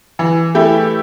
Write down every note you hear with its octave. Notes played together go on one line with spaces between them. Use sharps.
E3
A3 E4 G4